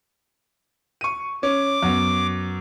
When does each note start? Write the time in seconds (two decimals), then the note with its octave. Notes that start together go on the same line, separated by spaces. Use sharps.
1.01 C#6 D#7
1.43 C#4 D6
1.82 F#2 B3